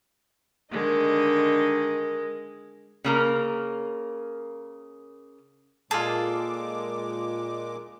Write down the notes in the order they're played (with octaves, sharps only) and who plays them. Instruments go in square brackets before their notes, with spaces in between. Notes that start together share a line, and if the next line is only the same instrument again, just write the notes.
[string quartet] D3 D#3 D#5 [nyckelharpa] G#3 A#4
[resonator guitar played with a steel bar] C#3 A#3 A#4
[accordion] A#2 G#3 D6 [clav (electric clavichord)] F4 G#4 [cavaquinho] A4